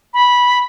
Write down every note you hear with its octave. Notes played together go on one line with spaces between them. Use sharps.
B5